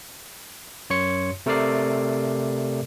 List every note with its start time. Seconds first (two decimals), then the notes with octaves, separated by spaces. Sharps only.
0.90 F#2 C#5 C6 C#7
1.46 C3 A3 A4 A#4 D5 C7